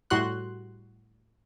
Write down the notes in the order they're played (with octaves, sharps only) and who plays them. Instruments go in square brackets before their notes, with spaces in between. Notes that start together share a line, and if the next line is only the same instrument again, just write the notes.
[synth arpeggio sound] A2 G3 F#4 C6 F#6